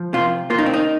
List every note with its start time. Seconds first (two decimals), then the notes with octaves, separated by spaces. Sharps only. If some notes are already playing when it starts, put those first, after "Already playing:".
Already playing: F3
0.13 C3 F4
0.50 A#3 F4
0.58 D#4
0.66 C4
0.74 D#4